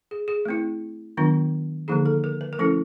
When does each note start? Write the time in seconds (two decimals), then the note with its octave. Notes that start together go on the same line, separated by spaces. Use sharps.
0.11 G#4
0.28 G#4
0.45 A3 C4 E4
1.17 D#3 F#3 B3 D4 F4
1.88 D3 F3 A#3 D#4 G#4
2.06 A4
2.24 A#4
2.41 B4
2.53 A#4
2.59 F3 A3 C#4 E4 A4